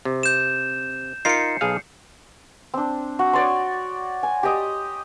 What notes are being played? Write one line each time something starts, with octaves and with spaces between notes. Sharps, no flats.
C3
G6 E7
D#4 F4 A#4 C7 C#7
B1 G#4 F5
C4 D4
F#4
C#5 D5 C6
G#5
G4 D#5